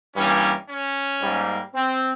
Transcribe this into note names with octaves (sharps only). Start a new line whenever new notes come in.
G2 E3 G3 A#3 C#4
C#4
G#2 G3 A#3
C4